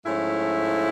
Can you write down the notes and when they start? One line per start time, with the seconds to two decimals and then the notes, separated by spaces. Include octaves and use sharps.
0.03 G#2 F3 A3 C#4 E4